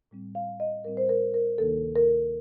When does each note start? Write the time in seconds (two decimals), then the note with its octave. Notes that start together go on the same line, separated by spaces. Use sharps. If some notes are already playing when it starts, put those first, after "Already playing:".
0.11 A2 G3 C4
0.35 F5
0.60 D#5
0.84 A2 G3 C4 A#4
0.97 C5
1.09 A#4
1.34 A#4
1.58 D2 C3 D#3 A#3 D#4 A4
1.96 A#4